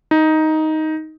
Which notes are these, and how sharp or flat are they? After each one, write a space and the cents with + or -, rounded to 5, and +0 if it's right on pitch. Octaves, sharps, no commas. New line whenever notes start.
D#4 +10